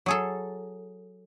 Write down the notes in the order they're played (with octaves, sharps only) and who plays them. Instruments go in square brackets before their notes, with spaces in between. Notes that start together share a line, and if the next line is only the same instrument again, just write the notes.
[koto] F#3 G#4 A4